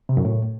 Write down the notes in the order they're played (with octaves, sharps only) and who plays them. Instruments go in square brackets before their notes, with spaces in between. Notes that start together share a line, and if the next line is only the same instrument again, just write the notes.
[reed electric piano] C3
F#2
A2